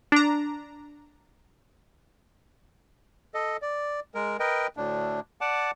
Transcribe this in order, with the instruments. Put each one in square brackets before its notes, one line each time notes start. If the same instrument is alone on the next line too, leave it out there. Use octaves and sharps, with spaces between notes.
[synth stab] D4 A#5
[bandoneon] A4 D#5
D5
G#3 A#4
A#4 B4 D#5 G5
D2 A2 D4
D5 F#5 A5 D6